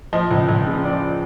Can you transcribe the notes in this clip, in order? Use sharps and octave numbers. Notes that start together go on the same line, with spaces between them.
F3 D#5
C#2
C#2
C#3
F3 D5